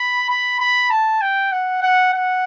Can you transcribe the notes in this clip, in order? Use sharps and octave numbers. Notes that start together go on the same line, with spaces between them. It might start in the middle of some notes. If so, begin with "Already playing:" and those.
Already playing: B5
B5
B5
A5
G5
F#5
F#5
F#5